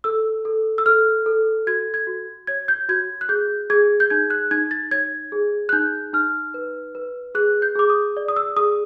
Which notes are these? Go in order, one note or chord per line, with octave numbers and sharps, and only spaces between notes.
A4 E6
A4
E6
A4 F6
A4
F#4 G#6
G#6
F#4
C#5 G#6
G6
F#4 G#6
F#6
G#4 G6
G#4 G#6
G6
D#4 G#6
F#6
D#4 G#6
A6
C#5 G#6
G#4
F#6
D#4 G6
D#4 F6
B4
B4
G#4 F#6
G6
G#4 D6
D#6
D5
D#6
E6
G#4 D#6